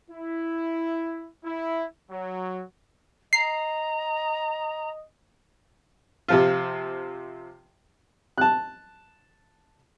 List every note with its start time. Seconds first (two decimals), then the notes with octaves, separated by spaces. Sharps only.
0.11 E4
1.45 E4
2.11 F#3
3.33 D#5 A#5 C7
6.28 C3 F3 F4
8.38 A5 F#6